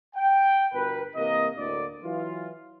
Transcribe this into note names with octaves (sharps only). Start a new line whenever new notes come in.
G5
G1 B2 A#4 B4
C3 E3 A#3 A#4 D#5
D2 A2 D3 A#3 D5
E3 F#3 F4